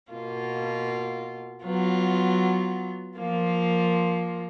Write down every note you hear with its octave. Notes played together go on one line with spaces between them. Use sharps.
B2 A#3 F4
F#3 B3 F4
F3 A#3 F4